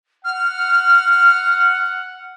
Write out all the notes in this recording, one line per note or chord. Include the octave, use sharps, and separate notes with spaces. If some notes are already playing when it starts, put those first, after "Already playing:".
F#5 F6